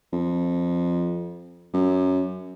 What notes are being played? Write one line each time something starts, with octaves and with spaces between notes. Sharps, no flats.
F2
F#2